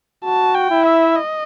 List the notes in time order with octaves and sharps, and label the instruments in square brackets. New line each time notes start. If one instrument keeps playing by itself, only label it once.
[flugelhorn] F#4 [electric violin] A5
[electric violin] G5
[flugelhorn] E4
[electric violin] E5
D#5